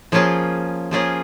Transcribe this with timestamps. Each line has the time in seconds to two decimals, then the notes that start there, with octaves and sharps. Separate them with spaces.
0.12 F3 A#3 C#4 F4 G#4
0.91 F3 A#3 C#4 F4 G#4